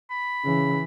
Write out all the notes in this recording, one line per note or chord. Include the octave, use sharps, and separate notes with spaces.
B5
C#3 E3